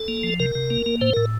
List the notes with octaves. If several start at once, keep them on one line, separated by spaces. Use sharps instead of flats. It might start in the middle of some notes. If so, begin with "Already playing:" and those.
Already playing: A4
A#3
F3
C3 A#4
C3
A#3
A#3
A2 C5
A2 A#4